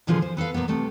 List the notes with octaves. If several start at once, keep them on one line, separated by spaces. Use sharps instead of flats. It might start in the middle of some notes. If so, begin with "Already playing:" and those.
A#2 D3 F3 F4 F#4 G#4
C5
B3 A4 B4 F5
A#2 F3 A#3 B3
D2 C3 A3